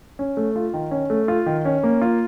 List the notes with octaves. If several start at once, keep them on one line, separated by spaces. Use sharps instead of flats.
C#4
A3
F4
D#3
C#4
A3
F4
D#3
C#4
A#3
F4